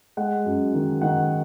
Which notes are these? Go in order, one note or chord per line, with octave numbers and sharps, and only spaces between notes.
G#3 F#5
F#2
D#3
D#3 F#5